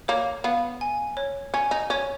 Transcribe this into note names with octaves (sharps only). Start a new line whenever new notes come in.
A#3 C#5
B3 F5
G#5
C#5
C#4 G#5
D#4
C#4 C#5